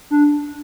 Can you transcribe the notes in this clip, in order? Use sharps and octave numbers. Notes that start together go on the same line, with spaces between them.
D4